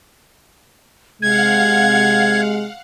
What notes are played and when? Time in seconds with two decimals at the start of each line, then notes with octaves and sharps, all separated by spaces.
1.22 C3 G#3 F5 F#5 G#6